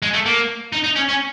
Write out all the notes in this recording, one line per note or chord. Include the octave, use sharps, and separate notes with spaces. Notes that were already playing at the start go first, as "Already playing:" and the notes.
G#3
A3
A#3
D#4
D#4
C#4
C#4